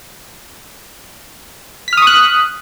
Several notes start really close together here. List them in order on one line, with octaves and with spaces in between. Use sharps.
B6 F6 D#6 C#6 F#6